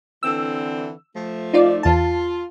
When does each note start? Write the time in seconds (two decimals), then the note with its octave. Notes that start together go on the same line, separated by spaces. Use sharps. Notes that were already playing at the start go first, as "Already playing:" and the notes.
0.23 D3 E3 C4 E6
1.15 F3 A3
1.53 D#4 F4 D5
1.83 E2 F4 A5